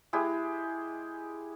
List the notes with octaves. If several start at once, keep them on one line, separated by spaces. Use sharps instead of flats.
G#3 E4 G4